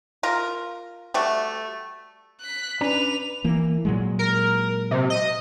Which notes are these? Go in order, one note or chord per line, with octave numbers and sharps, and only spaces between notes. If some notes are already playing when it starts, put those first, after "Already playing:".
F4 A#4
G3 A3 F#4
F#6 B6
C#4 D4 B4 A#5 F7
E3 A#3
A#2 F#3 G#3
A#4
C3
D#5